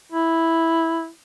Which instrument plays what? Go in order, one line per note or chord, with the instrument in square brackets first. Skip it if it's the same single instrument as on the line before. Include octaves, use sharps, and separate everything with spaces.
[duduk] E4